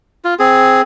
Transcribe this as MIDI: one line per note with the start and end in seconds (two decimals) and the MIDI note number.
0.25 0.34 65
0.39 0.81 60
0.39 0.81 68